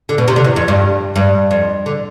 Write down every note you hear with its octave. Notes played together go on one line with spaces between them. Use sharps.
D3
B2
C3
D3
E2
F2
G2
G2
F2
D3